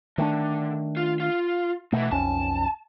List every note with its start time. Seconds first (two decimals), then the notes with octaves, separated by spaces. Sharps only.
0.18 D3 D#3 A3 D4
0.97 F4
1.20 F4
1.92 B2 D#3 E3 A3
2.11 B1 F2 C#4 A5